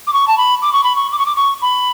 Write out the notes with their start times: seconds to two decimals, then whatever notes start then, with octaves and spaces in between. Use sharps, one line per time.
0.07 D6
0.13 C#6
0.28 A5
0.37 B5
0.62 D6
0.73 C#6
0.84 B5
0.96 C#6
1.12 D6
1.19 C#6
1.26 D6
1.36 C#6
1.62 B5